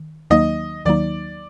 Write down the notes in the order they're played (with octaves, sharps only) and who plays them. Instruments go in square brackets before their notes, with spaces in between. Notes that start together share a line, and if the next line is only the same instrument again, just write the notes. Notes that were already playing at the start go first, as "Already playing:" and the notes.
Already playing: [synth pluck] D#3
[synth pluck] D#2 D#3 F#3 A#3 D#4 [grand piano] D#5
[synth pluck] D#2 D#3 F#3 A#3 D#4 [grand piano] D5